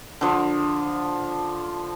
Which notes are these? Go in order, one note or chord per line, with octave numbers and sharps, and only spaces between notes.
D3 F3